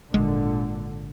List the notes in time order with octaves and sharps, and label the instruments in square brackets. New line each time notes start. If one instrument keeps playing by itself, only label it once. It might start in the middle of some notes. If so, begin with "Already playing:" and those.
[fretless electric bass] G#1 G#3 [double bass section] A#2 D3